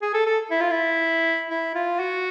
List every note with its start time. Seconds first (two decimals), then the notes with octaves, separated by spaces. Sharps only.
0.03 G#4
0.14 A4
0.27 A4
0.51 E4
0.61 F4
0.71 E4
1.50 E4
1.75 F4
1.99 F#4